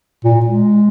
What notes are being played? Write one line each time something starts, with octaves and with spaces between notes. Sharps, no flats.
A#2
G#3